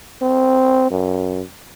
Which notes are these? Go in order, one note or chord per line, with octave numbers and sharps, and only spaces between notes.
C4
F#2